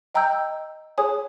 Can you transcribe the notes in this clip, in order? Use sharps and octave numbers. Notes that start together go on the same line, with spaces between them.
D#5 G5 A#5 E6 G6
G#4 C#5 G#5 D#6